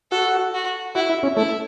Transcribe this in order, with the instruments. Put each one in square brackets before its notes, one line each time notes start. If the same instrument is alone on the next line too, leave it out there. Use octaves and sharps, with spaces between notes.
[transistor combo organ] F#4 [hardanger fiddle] A4
[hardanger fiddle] F#4
[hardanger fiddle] E4 [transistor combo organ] F#4
[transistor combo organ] E4
C#4
[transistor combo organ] A3 [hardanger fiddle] E4